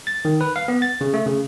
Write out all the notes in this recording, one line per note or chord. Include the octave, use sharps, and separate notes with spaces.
A6
D#3
B4
F5
B3
A6
C#3
A3
C#3